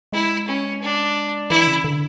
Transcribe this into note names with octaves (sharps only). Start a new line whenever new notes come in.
G#3 E4
C#4
D4
E3 E4
C#3
D3